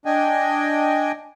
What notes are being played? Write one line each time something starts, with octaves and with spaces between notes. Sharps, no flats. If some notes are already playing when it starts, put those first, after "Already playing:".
D4 D#5 G5 G#5